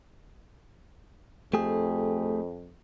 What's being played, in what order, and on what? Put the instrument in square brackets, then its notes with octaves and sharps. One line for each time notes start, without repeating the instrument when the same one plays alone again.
[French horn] F2 [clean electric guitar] A3 G4 G#4